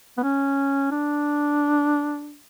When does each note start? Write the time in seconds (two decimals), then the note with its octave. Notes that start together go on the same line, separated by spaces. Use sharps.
0.18 B3
0.23 C#4
0.91 D4